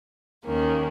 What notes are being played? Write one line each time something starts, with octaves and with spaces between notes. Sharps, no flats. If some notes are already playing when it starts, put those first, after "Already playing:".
D#2 D#3 A#3 C#4